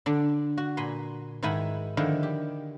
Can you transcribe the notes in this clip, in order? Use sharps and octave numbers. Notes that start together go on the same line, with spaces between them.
D3 D4
F#4
A#2 G#5 B5 C6
G#2 D#3 E4 G#5 B5
D3 D#3 F3 G#3 E4
G4